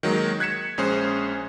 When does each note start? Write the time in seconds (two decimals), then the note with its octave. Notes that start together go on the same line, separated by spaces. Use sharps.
0.03 D#3 F#3 G#3 A#3
0.40 F#6 G#6 B6 C#7 E7
0.78 A#1 G#3 C#4 G#4 C5